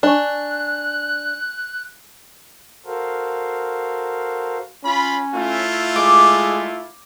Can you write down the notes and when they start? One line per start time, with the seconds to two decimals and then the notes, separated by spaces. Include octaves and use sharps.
0.03 D4 D#5 G#5 C#6 F#6
2.86 F#4 A4 A#4 C5 F5
4.84 C#4 F4 B5
5.33 A3 E4 F4
5.96 G#3 D6